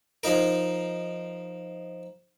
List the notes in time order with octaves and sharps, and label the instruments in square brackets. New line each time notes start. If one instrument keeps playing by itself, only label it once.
[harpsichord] F3 D#4 A#4